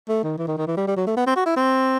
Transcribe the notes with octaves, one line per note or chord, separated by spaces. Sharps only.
A3
D#3
E3
D#3
D#3
E3
G3
G3
F#3
A3
B3
C4
F#4
E4
C4